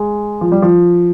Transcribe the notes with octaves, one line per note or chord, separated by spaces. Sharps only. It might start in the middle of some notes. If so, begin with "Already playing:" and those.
Already playing: G#3
F3
G3
F3